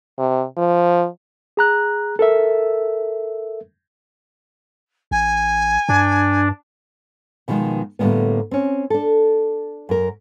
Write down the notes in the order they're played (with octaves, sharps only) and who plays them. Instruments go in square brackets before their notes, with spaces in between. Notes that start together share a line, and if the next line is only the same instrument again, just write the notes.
[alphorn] C3
F3
[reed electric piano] G#4 A#5 F#6
A4 A#4 E5
[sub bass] A1 [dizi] G#5
[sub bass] G2 [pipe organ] D4
[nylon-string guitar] B2 D3 D#3 F3 G#3
A2 D3 G3 G#3 A#3 B3
C4 C#4
D4 A4
F#2 A#4